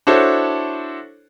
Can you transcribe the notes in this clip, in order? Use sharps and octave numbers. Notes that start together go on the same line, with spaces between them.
D4 E4 F#4 A4 C5 C#5